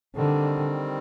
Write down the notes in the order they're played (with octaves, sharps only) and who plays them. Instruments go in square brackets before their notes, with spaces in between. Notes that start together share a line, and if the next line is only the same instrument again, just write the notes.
[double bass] D3 [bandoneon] D#3 G3 C4